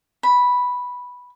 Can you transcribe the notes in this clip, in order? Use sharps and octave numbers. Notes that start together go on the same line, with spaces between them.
B5